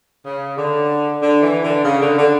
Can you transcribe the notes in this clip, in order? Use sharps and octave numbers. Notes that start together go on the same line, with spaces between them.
C#3
D3
D3
E3
D3
C#3
D3
D3